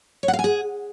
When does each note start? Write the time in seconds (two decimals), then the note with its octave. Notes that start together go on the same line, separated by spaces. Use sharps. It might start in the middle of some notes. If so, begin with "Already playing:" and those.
0.23 C#5
0.28 F#5
0.33 F5
0.39 G#5
0.44 G#4